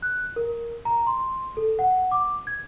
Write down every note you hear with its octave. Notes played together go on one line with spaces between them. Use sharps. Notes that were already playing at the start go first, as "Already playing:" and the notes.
F#6
A#4
A#5
C6
A4
F#5
D6
G#6